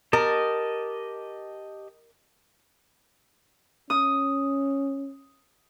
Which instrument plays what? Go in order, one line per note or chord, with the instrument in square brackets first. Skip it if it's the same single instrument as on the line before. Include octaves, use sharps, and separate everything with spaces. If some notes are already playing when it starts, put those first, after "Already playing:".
[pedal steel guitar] G4 D#5 A5 [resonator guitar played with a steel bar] A#4
[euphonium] C#4 [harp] D#6